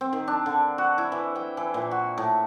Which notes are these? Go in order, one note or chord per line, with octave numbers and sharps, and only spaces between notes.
C4
D#3
D4
D3
F#4
E4
E3
G5
E3
A#2
F#4
A2